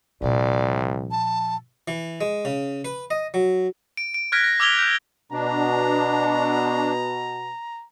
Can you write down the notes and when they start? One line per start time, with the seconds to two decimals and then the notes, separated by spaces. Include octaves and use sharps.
0.22 C2 A#2 F3 D5
1.11 A5
1.88 E3
2.21 G#3
2.45 C#3
2.85 B4
3.11 D#5
3.34 F#3
3.97 D7
4.14 D7
4.32 F6 F#6 G#6 A#6 B6 D7
4.44 A#6
4.60 D6 E6 G#6 F7 G7
4.78 F#6 G6
5.32 B2 D4 A#5